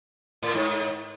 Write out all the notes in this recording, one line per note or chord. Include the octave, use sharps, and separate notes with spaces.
A2
G#2